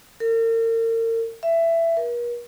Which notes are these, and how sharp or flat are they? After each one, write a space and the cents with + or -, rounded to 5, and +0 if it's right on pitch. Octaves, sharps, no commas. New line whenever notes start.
A#4 -40
E5 +15
A#4 +45